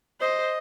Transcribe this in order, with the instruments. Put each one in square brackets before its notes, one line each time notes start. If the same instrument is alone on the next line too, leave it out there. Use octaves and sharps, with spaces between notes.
[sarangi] C5 [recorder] D#5